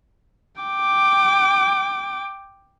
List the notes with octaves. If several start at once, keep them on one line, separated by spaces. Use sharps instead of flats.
G5 D6